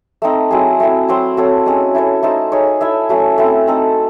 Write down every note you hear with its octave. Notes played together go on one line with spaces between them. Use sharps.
A3 C4 D#4
F#3 C4 E4 G#4
A3 C4 E4
F#3 C4 F#4 C5
C4 F#4 A4 C#5
G#3 C#4 G#4
E4 A4 C#5
A3 D#4 A4 C5
D#4 G#4 C#5
E4 A4 C#5 E5
F#3 A3 C#4
A3 C4 E4
C4 D#4 A4